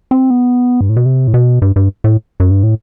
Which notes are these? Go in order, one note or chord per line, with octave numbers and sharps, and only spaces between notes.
C4
B3
G2
A2
B2
C3
A2
B2
G2
G2
A2
F#2
G2
A2